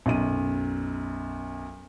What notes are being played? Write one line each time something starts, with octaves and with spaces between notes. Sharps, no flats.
B1 F#2 D#7